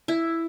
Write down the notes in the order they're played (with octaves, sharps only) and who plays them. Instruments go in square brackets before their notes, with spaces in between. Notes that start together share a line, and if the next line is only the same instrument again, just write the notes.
[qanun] E4